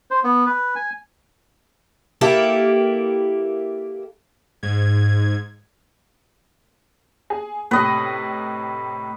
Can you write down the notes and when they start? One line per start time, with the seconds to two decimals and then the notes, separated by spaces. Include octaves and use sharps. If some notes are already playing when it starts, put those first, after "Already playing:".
0.11 C5
0.24 B3
0.46 B4
0.75 G#5
2.21 A#3 E4 G4 A4
4.63 G#2 G#6
7.30 G#4
7.71 A2 C3 B4 D#5